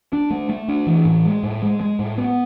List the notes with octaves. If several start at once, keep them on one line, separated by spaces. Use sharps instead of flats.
D4
A3
A3
D4
E3
A2
G#3
A2
G#3
G#3
A2
B3